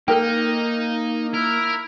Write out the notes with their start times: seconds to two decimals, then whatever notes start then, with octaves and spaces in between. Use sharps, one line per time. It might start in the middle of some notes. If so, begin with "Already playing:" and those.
0.08 A#3 D#4 A4 A#4 G5
1.34 E4 A#4